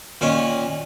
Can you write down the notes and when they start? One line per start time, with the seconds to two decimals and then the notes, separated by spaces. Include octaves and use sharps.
0.21 A#2 D#3 C#4